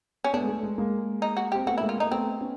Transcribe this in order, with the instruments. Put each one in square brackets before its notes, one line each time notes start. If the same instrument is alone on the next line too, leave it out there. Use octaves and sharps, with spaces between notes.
[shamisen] C#4
[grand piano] A3 B3 [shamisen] D4
[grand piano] G#3
A3
G#3
G#3 A#3
[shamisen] D#4
F#4
[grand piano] C4 [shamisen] G4
[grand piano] A3 B3 [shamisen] F#4
[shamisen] E4
[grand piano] G#3 A#3
[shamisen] F4
[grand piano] A3 [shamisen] D#4
[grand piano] A#3
[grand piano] A3 B3 [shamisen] C4
[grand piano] B3 C#4